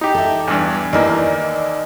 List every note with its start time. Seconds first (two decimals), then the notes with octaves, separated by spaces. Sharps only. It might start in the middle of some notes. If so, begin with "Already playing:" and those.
0.01 D#4 G4
0.15 A4 E5
0.48 E2 G2
0.93 D#2 E3 A#3 D#4 D5